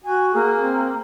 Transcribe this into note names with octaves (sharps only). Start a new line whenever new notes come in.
F#4 G#5
A#3 G#4
C4